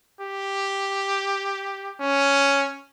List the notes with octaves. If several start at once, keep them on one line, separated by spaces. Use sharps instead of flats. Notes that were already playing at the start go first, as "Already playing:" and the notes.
G4
C#4